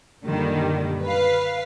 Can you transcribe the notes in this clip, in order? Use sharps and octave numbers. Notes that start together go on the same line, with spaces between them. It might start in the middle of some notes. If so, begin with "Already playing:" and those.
F#2 A#2 D3 D#3 G3
B4 F5